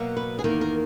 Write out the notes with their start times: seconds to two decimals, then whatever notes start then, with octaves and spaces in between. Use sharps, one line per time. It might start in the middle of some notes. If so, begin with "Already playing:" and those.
Already playing: B2 F#3 A#3
0.17 B4
0.39 G#4
0.44 E2 D#3 A#3 A#4
0.61 A#4